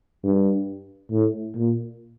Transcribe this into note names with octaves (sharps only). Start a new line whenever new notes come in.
G2
A2
A#2